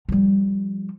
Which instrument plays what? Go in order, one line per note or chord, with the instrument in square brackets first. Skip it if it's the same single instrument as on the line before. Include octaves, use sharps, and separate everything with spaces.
[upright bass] F3 G3